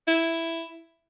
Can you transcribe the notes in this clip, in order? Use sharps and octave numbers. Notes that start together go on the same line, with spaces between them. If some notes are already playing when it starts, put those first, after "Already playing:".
E4